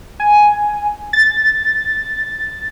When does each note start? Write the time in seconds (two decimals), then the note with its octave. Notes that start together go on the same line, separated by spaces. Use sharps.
0.20 G#5
1.13 A6